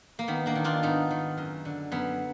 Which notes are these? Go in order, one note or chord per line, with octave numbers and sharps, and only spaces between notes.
A#3
D#3 B3
A#3 D4
D#3
D4 F4
G#2 B3 D#4
D#3
F#2
D3
F#2 B3